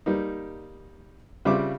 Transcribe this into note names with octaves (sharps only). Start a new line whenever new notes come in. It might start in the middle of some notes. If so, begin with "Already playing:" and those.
G3 A#3 D#4
C#3 G3 C4 F4 E5 D6